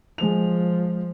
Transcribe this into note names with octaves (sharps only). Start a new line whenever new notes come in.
F3 G#3 F7